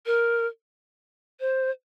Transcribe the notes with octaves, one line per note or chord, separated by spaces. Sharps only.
A#4
C5